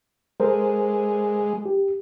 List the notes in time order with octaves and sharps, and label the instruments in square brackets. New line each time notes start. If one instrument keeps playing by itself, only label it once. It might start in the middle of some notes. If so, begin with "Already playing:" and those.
[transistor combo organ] G#3 [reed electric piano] A4 A#4 C5
[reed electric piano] G4